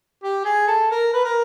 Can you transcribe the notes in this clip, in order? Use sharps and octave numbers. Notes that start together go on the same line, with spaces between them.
G4
G#4
A4
A#4
B4
A#4